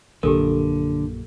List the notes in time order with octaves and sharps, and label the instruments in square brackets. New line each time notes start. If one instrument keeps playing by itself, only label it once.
[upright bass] A#1 F#2 [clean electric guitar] D3 [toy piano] G4 A4 A#4